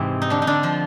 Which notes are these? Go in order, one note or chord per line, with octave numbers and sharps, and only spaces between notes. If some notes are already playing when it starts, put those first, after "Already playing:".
Already playing: G#2 C3 E3 C4
D#4
D3 D4
D#4
D3 D4
F3 F4